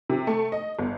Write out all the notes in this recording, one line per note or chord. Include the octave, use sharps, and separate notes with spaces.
C3
A3
D#5
G1